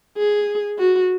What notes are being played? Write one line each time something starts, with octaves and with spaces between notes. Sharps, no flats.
G#4
F#4